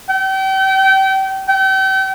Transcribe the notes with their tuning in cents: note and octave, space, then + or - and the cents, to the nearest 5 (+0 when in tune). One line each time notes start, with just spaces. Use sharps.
G5 -35
G5 -40